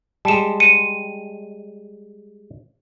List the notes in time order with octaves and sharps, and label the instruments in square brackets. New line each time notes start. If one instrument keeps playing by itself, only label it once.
[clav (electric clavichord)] G3 G#3 [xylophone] A5 E7
[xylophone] C#7 [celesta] D#7